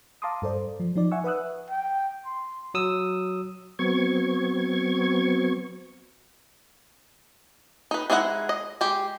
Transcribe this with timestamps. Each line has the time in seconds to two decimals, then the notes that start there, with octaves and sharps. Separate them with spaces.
0.22 F5 A5 A#5 C6 D6 D#6
0.42 G2 A4 C5 D5
0.80 F3
0.96 F3 D#4 D5
1.11 E5 F#5 G#5 C#6 E6
1.24 B4 E5 F#5 D#6 E6 F#6
1.70 G5
2.26 C6
2.74 F#3 D#6 E6
3.79 F#3 B3 C4 C#6 G#6
7.91 D#4 B4
8.10 G#3 D#4 E4 B4 F#5
8.49 D#5
8.81 G#3 G4